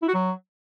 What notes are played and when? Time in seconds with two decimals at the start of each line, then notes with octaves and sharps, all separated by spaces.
0.02 E4
0.08 F#4
0.14 F#3